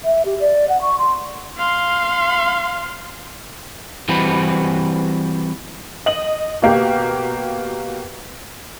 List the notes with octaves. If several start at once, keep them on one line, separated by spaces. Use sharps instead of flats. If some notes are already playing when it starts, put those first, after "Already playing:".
E5
G4
D5
F#5
C#6
C6
F5 C6
E3 G3 C4 F#4 B4
D#5 F#7
B2 A#3 G4